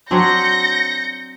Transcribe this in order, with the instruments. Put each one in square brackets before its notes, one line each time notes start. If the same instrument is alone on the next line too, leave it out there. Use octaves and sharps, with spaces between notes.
[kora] F#3 C4 D4 [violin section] G6 A#6 C#7